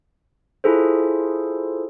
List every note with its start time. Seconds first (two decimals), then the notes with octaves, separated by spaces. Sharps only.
0.64 E4 F4 G#4 A4 C5